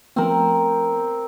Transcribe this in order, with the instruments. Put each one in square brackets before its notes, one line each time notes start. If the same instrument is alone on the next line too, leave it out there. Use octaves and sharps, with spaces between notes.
[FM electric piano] F3 A3 B3 [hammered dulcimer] C4 A#4